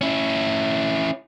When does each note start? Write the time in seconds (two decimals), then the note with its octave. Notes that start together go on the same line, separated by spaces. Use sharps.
0.01 C#4 E4